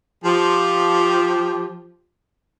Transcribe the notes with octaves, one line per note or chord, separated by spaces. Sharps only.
F3 G4